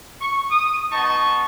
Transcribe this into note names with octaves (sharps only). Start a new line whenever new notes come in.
C#6
D#6
B3 D#4 D#5 A5 C#6